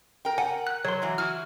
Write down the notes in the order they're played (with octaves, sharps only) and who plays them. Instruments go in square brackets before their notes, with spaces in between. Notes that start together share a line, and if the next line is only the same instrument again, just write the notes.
[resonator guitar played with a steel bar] A#4 G5
[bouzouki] F#5 [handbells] G#5
[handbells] F#6
[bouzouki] F#3 [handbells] C#5 C6
[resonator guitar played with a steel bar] E3 G#3
[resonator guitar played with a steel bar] E3 E4 F#4 [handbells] F6